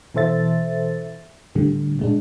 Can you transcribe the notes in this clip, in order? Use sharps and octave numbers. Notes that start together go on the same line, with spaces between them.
B2 E3 A4 C5 E5 A6
A2 D3 G3
A#2 G#3 D4